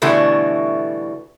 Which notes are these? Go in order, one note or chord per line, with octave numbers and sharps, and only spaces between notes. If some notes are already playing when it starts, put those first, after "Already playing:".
B2 D3 E3 G3 A3 F#4